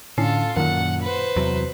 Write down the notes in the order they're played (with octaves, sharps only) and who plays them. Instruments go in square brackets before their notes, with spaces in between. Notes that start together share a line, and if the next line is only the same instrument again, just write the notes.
[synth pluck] A2 C#4 C7 [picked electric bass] D3 [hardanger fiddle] F4 A4
[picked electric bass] F#2 A#2 [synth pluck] D#3 [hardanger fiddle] F#5
[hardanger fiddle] B4 C5
[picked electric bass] E2 C3 F#3